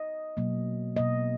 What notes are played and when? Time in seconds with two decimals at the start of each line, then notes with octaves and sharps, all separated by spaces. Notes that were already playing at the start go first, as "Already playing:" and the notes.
Already playing: D#5
0.37 B2 F#3 A#3
0.96 B2 A#3 D#5